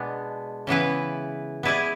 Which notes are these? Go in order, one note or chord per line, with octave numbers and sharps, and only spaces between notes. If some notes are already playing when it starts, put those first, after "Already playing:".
Already playing: B2 G#3 B3 D4
C#3 E3 B3 E4 B4
B3 E4 G#4 B4 D5